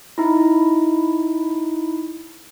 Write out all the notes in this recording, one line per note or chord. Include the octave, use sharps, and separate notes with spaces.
D#4 E4